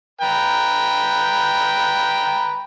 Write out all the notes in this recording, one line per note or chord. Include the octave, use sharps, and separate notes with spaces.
B4 G5 A#5